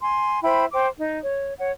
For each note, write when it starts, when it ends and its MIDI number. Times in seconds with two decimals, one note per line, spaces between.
0.02 0.42 80
0.02 0.42 84
0.43 0.65 64
0.43 0.65 72
0.43 0.65 79
0.43 0.65 83
0.72 0.88 72
0.72 0.88 79
0.72 0.88 86
0.97 1.18 63
1.22 1.53 73
1.59 1.70 73
1.59 1.70 78